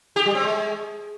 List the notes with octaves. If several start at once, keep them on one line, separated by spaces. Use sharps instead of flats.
G4
G3
C4
G#3